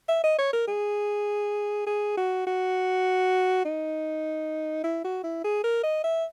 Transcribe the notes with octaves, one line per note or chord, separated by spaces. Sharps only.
E5
D#5
C#5
A#4
G#4
G#4
F#4
F#4
D#4
E4
F#4
E4
G#4
A#4
D#5
E5